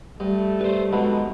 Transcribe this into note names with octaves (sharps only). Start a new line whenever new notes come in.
G2 A3
G3 B4 C5
B2 G#3 A#3 D#4 F#4 A4 B4